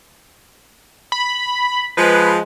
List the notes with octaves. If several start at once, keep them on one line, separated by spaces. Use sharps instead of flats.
B5
F3 G#3 B4